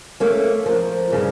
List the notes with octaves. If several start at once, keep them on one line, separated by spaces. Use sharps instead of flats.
A3 A#3 C#4
F3 A#4
G2 C#3 E3